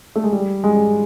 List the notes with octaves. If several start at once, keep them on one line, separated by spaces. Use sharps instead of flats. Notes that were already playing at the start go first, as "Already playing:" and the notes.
A3
G#3
G3
G#3